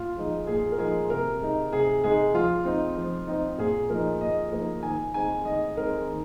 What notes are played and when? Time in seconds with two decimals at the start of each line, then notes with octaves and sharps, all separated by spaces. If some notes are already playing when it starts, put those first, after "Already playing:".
Already playing: A#2 F4
0.17 F3 G#3 D#4
0.47 A#2 G#4
0.72 A#4
0.78 F3 G#3 D#4 G#4
1.10 C3 A#4
1.41 G#3 D#4
1.72 C3 G#4
2.04 G#3 D#4 G#4
2.34 F3 F4
2.65 C4 D#4
2.97 F3
3.27 C4 D#4
3.58 A#2 G#4
3.90 F3 A#3 D#4 A#4
4.21 A#2 D#5
4.52 F3 A#3 D#4
4.83 D#3 G#5
5.14 G#3 C4 D#4 G#5
5.45 D#3 D#5
5.77 G#3 C4 D#4 A#4
6.08 D#3